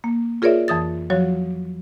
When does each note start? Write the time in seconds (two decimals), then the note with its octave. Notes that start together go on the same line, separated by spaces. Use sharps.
0.04 A#3
0.42 F4 G#4 A#4 C#5 D5 E5
0.68 F2 E3 D#6 A6
1.10 F3 F#3 F#4 C#5